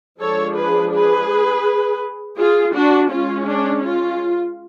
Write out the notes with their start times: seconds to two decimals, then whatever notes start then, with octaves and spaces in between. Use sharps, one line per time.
0.20 F3 G#3 D4 A4 C#5
0.56 G#4 B4
0.93 G#4 B4
2.38 F4 G#4
2.75 D4 F#4
3.11 G#3 C#4 F4
3.47 D4
3.84 F4